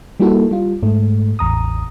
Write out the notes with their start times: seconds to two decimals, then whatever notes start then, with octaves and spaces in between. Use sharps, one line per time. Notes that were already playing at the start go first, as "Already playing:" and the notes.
0.20 G3 A#3 D#4 E4 F#4 A4
0.51 G3 F4
0.83 G#2 A3
1.39 A1 E2 A#5 D#6